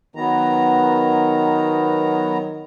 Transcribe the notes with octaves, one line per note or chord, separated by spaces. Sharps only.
D#3 F#3 B3 A#5